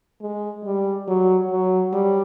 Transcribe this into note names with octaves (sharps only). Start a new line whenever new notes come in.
G#3
G3
F#3
F#3
G3